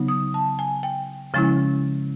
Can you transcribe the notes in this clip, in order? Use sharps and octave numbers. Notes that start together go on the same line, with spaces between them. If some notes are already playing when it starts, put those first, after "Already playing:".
Already playing: C#3 F#3 B3 D#4
D#6
A5
G#5
G5
C#3 F3 G#3 C#4 E4